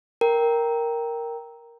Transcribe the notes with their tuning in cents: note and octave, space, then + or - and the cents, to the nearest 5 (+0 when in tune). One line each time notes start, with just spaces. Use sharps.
A#4 +0 G5 +0